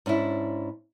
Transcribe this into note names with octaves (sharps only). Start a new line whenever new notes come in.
G#2 C#4 D4 E4